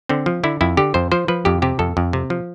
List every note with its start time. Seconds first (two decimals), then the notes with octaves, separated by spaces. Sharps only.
0.09 D3 C4
0.26 F3
0.44 D3 E4
0.61 F2 E4
0.77 D3 G4
0.94 F2 C5
1.12 F3 C5
1.28 F3 B4
1.45 F2 G4
1.62 C3 G4
1.79 F2 A4
1.97 F2
2.13 C3
2.30 F3